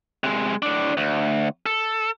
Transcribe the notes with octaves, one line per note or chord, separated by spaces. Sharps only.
C3 G#3
A2 D4
D2
A4